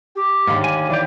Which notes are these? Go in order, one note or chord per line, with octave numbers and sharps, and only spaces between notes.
G4
D#2 G#2 D3 F5
G#5
E3 G4 D5